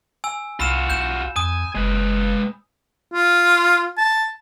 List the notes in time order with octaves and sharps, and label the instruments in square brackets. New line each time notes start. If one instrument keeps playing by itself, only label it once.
[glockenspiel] G#5 E6
[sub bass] C2 [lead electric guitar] F4 F#4 [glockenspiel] B5 E6 E7
[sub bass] B1 [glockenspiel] G6 E7
[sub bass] F2 [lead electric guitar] G#5 [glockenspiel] D#6
[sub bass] F#1 [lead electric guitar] G#3 B4
[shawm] F4
A5